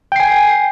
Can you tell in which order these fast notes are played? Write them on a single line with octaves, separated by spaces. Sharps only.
G5 C7 G#5